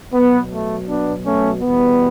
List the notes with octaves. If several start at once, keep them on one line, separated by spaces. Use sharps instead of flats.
B2 F#3 B3
A3
B3 D4
A3 C#4
E2 B2 G3 B3